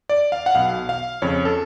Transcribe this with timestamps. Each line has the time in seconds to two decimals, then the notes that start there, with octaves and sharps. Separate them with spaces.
0.09 D5
0.32 F5
0.46 F#5
0.55 B1 B2 F5
0.89 F5
1.22 F2 C#3 C#5
1.45 A4